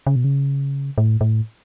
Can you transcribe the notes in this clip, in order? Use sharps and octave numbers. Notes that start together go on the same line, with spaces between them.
C#3
B2
C#3
A2
A2